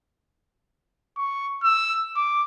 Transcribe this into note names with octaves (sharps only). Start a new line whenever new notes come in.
C#6
E6
D6